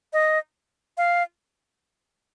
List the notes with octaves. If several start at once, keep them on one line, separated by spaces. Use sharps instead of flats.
D#5
F5